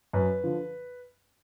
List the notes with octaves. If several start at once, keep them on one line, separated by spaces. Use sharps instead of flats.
F#2 B4
D3 F3